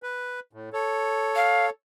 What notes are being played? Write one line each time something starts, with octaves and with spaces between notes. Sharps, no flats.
B4
A2
A4 C#5
F5